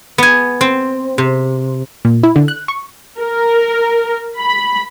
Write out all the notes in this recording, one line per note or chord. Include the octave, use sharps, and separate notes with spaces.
B3 G#5
C4
C3
A#2
E4
D3
F#6
C#6
A#4
B5